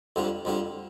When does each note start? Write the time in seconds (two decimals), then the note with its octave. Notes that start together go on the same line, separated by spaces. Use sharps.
0.16 F2 D3 G3 D4 F4
0.45 F2 D3 G3 D4 F4